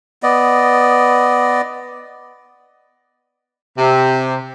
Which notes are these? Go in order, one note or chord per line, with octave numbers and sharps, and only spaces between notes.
B3 D5 D#5
C3